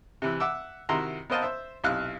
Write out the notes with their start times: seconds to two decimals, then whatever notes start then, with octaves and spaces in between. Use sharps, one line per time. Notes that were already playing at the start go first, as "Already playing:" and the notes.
0.22 C3 E3
0.40 E5 F#5 D6 E6
0.89 C3 D#3 E4 F#4 A#5 C6
1.30 B3 A#4 C5 D#5 F5 A5
1.43 C5 E5
1.84 B1 C3 E4 F5 F6 F#6